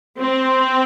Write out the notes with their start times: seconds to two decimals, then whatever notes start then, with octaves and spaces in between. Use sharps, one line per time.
0.18 C4